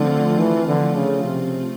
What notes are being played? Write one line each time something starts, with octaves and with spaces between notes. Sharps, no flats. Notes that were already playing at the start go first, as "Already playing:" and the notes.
Already playing: D3 F3 A3 C4 F4
E3
D3
C#3
C3